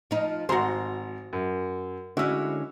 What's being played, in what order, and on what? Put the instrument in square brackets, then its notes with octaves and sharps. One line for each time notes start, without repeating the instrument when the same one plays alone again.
[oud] F3 D#4
[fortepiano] G#1 A#5 [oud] F#4 C5
[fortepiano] F#2
[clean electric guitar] D3 G#3 [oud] C#4 E4 [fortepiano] F#4 E6